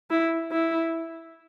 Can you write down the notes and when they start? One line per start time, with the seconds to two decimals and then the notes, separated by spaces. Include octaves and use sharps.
0.11 E4
0.52 E4